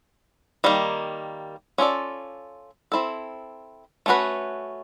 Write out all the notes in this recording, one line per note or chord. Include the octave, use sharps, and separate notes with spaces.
D#3 G3 A#3
C#4 F4 A4 D5
C4 E4 A4
A3 C#4 F#4 B4